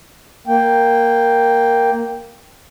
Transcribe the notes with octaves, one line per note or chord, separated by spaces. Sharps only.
A#3 G5